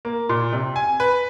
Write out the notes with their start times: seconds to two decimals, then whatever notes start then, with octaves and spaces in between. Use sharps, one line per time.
0.05 A#3
0.29 A#2
0.52 C3
0.76 G#5
1.00 B4